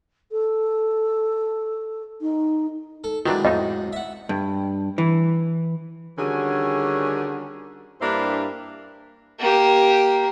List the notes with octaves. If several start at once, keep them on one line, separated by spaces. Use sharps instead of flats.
A4
D#4
A4
D#3 E3 F#3 G#3 D4 E4
F2 A2 D#4 D#5
E5 F#5
G2
E3
D3 D#3 G3 C#4 F#4 G#4
G2 A#3 D4 E4 G4 C5
A#3 G4